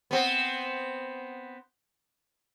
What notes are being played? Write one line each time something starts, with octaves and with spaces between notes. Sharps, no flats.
B3 C4